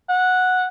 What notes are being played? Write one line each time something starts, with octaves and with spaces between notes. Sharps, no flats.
F#5